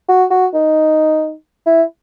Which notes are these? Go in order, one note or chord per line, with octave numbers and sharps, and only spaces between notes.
F#4
F#4
D#4
E4